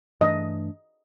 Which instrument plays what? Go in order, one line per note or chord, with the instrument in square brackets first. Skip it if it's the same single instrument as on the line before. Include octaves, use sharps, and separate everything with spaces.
[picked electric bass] G2 E3 A3 D4 [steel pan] D#5